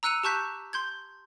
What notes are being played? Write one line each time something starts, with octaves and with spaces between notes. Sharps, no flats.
A#5 E6 F#6 C#7 D#7 F7
G4 A5 C#6 F#6 G6 B6
C6 G6 G#6